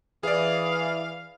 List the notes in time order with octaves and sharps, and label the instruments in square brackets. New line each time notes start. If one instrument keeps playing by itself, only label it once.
[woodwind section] E3 [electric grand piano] G#4 D5 [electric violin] F5